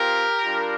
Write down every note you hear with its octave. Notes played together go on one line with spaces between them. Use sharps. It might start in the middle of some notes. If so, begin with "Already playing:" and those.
Already playing: C4 F4 G4 A#4
G3 D4 F4